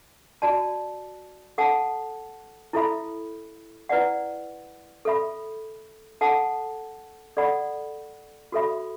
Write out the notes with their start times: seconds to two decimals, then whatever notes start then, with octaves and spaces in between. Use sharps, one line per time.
0.42 F#4 D5 A5
1.58 A4 F#5 A5
2.73 E4 A4 E5 B5
3.89 E4 B4 D5 F#5
5.05 A4 E5 B5
6.21 A4 F#5 A5
7.37 A4 D5 F#5 B5
8.52 F#4 A4 E5 B5